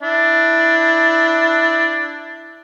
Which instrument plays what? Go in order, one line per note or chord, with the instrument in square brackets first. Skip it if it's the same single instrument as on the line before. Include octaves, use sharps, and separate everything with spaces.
[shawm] D4 [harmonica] E4